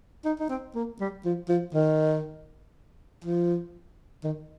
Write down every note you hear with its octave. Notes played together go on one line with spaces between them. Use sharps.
D#4
D#4
C4
A#3
G3
F3
F3
D#3
F3
D#3